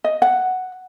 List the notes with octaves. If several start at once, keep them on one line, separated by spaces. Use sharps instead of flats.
D#5
F#5